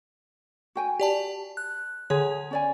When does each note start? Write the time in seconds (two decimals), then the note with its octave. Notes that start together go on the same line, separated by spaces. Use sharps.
0.75 F#4 G5 G#5
1.00 G4 D5 A5
1.57 F#6
2.10 D3 G#4 C#5
2.51 C#4 D5 G#5